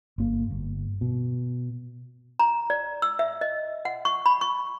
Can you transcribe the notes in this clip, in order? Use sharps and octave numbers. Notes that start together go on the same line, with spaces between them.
G1 A#3
G1
B2
A#5
D5
E6
E5
D#5
F#5
C#6
B5
C#6